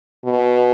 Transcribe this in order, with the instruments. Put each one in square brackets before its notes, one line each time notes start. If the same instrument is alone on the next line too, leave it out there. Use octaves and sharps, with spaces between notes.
[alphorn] B2